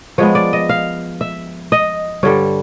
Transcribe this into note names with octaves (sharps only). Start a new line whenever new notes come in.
F3 G#3 B3 C#5
D5
D#5
F5
E5
D#5
G2 D3 G3 C#5